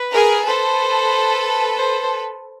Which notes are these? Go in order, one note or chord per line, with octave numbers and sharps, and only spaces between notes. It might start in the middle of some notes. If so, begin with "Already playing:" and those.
Already playing: B4
G#4 A#4
A4 B4 C5
C5